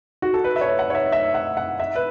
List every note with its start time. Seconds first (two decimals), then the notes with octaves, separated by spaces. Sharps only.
0.22 F#4
0.34 A4
0.44 B4
0.56 E5
0.61 C#5
0.79 F#5
0.90 C#5
0.95 E5
1.12 E5
1.34 F#5
1.57 F#5
1.80 E5
1.96 B4